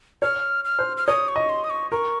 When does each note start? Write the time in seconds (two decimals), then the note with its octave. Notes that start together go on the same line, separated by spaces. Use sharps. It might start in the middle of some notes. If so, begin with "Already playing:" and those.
0.22 C#5 F6
0.65 F6
0.79 C5
0.97 F6
1.07 C#5 D#6
1.28 C#6
1.36 D#5
1.49 C6
1.64 D#6
1.70 C#6
1.91 A#4 C#6